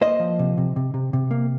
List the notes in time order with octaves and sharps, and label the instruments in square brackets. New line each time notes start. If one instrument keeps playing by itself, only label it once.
[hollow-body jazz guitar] A#3 C5 D#5
F3
C3
C3
C3
C3
C3
A#3